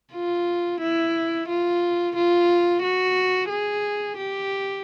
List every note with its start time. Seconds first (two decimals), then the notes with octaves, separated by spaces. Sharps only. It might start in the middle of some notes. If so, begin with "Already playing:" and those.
0.14 F4
0.82 E4
1.49 F4
2.16 F4
2.83 F#4
3.50 G#4
4.18 G4